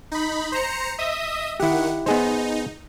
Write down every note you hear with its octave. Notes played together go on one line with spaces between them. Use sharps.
D#4 B5
C5 A#5 C#7
D#5 E5 D#6
D#3 E4 G4 F#5
B3 D#4 G#4 C5